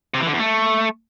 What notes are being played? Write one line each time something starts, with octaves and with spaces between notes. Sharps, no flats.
C3
E3
D3
E2
A3